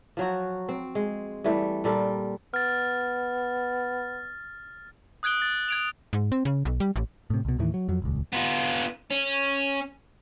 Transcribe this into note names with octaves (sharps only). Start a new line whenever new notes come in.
F3 F#3 F#4
C4
G#3
E3 G3 A3
A#2 G3 A4 A#4
B3 F6 A6
D#6 F#6 G#6 D7 G7
A6
G#6 D7 F7
G#2
C4
C#3
B1
G3
A1
A2 C3
C2 B2
D#2 A2 D#3 E3
F#3
F2 F#3
D#1 C#2
B3 F4
C#4